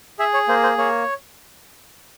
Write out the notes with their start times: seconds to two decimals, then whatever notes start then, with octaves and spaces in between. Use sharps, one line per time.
0.19 G#4 E5
0.34 C#5
0.48 A#3 C5
0.63 C5
0.78 A#3 C#5